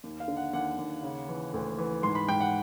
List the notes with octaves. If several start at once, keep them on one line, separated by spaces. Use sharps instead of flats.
D#2
F5
D3
F#5
D#2 F#5
D#2
C#3
E3
D2
E3
G#2 C6
B5
G#2 G5
F#5